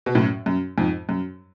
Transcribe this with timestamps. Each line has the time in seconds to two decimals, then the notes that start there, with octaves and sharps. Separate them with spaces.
0.06 B2
0.15 F#2 A2
0.46 F#2
0.78 F2 G#2
1.09 F#2